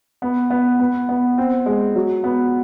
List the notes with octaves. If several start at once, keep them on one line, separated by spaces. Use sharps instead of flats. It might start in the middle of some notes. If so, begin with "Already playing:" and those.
B3
B3
B3
B3
C4
G#3
F#3
B3